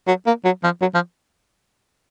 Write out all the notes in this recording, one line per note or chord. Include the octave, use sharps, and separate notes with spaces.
F#3
A#3
F#3
F3
F#3
F3